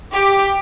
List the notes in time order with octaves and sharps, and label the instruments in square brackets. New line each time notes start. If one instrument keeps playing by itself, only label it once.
[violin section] G4